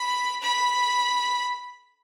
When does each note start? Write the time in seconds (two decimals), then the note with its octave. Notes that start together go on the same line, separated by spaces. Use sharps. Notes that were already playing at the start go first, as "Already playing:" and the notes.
Already playing: B5
0.42 B5